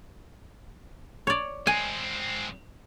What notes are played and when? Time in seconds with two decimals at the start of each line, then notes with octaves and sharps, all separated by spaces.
1.27 C#5 D5
1.67 G#3 C4 G#5